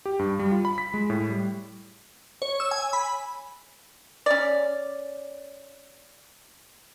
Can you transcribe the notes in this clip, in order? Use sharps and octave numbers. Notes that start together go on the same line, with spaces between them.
G4
G2
G3
F4
B5
B6
G#3
A2
G3
C#5
E6
G#5
B5
C#4 D5